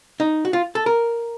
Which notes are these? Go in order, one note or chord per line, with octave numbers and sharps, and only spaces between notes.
D#4
F#4
F4
A4
A#4